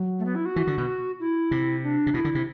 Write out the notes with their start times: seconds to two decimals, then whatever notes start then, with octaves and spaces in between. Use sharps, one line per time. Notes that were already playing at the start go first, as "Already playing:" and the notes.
Already playing: F#3
0.19 A3
0.25 B3
0.35 E4
0.45 F#4
0.56 E3
0.67 D3
0.78 B2
1.20 E4
1.51 C3
1.83 D4
2.07 C3
2.14 B2 E4
2.25 D3
2.35 C3